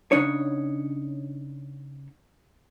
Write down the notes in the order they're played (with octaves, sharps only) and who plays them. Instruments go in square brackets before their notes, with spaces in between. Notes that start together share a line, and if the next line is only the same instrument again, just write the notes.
[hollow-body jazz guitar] C#3 D4 D#4 C#5